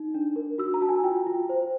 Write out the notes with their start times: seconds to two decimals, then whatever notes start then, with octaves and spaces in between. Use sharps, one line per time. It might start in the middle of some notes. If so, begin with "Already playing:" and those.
Already playing: D#4
0.15 D4
0.36 A#4
0.58 F#4 E6
0.74 A#5
0.81 F#4 A5
0.89 G#5
1.03 F4 G5
1.26 F4
1.49 C5